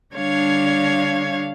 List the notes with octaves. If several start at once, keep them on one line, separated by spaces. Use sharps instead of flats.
D3 G3 D4 C#5 F5 G#6